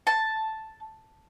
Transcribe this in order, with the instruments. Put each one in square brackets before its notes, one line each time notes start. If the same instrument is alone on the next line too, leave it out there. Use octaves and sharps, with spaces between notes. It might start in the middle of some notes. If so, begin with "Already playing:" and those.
[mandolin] A5